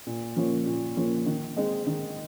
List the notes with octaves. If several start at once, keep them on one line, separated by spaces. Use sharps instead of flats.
A#2
F3 A#3 C#4
A#2
F3 A#3 C#4
D#3
G#3 C4 D#4
D#3